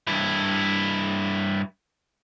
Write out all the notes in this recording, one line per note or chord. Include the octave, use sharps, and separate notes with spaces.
G2 E4